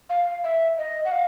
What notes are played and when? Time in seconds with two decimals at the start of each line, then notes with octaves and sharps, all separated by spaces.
0.10 F5
0.44 E5
0.78 D#5
1.05 F#5
1.12 F5